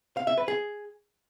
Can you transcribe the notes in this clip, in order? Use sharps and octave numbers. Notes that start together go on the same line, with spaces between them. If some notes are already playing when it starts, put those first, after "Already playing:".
F5
E5
B4
G#4